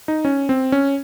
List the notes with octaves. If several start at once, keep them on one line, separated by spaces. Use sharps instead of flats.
D#4
C#4
C4
C#4